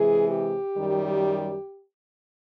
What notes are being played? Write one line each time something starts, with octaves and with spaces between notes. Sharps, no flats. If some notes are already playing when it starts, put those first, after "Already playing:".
Already playing: C3 E3 G#3 G#4
G4
F#2 D#3 G3